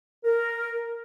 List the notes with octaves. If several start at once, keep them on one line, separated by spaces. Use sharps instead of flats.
A#4